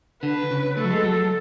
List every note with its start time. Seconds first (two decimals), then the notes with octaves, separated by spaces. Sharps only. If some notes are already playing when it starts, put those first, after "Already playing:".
0.23 D3 B4
0.51 C#3
0.77 A3 A4
0.84 F#3
0.90 G#3
1.04 F#3